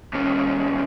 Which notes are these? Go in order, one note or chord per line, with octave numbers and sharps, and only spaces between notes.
D#2 C#4